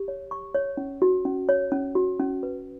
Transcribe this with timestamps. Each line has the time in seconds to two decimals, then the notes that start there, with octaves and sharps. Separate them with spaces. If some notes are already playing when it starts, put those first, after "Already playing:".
Already playing: G4
0.08 C#5
0.31 C#6
0.54 C#5
0.77 C#4
1.02 F#4
1.25 C#4
1.49 C#5
1.72 C#4
1.95 F#4
2.20 C#4
2.43 B4